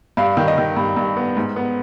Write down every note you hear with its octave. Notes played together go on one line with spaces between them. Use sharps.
G2 F5
D#3
D#5
D#3
G2
G2
B3
G#2
B3